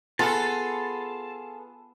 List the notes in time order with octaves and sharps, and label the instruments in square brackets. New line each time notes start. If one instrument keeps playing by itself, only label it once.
[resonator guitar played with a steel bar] B3 [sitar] F4 A4 [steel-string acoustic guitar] G#4 [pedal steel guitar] A5